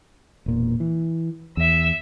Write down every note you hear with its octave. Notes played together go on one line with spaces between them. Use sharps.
E1 A#2
E3
E2 E5 E6